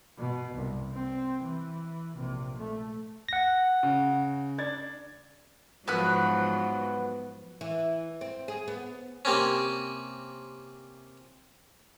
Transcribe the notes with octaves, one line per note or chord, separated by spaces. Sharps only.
B2
C2
C4
E3
A#1 C3
A3
F#5 A#6
C#3
D4 G#6 A6
G#2 F3 F#3 B3 B5 F#6
E3
C4
G#4
B3
C3 A#3 C4 C#4